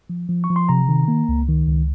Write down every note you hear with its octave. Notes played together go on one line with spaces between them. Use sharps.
F3
F3
C#6
F3
C6
C3 A#5
D#3
A#3
C#2
D#3
C#2